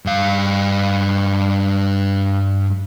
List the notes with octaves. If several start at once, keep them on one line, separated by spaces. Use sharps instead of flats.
G2 F5